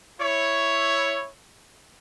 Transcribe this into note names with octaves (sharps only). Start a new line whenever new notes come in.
E4 C#5